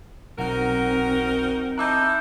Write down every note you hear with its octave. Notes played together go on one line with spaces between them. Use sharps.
B1 C4 D#4 F#4 A#4 F#5
D#4 E4 A5 A#5 D6 E6 F#6 G6